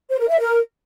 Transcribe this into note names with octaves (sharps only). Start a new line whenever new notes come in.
C5
A#4
E5
A#4